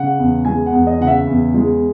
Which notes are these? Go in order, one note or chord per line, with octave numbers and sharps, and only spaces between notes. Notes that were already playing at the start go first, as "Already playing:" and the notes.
Already playing: C#3 F#5
E2
G#3 G#5
F#5
E2
D#5
C#3 F#5
E5
E2
G#3